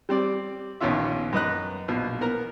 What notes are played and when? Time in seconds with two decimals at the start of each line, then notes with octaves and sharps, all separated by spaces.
0.09 G3 C4 D5
0.80 A#1 D#2 B3 C#4 F4 E5
1.33 F#2 B4 D#5 F#6
1.88 A#1 B2
2.21 B3 A#4 A#5